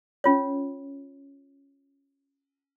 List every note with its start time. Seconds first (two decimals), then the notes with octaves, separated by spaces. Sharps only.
0.24 C#4 F4 C#5